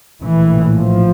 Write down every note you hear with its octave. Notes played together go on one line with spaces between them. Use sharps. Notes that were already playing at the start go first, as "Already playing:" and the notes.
A#1 A2 E3
F3